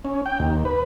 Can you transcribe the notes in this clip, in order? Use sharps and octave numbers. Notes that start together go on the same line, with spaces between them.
C#4
G5
D#2
B4